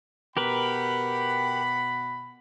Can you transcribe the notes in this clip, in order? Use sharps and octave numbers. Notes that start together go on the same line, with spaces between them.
B2 G4 A#4 B4 F#5 B5